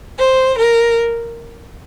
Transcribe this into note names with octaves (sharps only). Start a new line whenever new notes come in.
C5
A#4